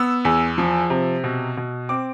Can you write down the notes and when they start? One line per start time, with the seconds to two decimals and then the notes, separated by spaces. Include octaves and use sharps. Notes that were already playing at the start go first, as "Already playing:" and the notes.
Already playing: B3 E6
0.25 E2
0.58 F3
0.90 C3
1.24 B2
1.57 B2
1.89 C4 D6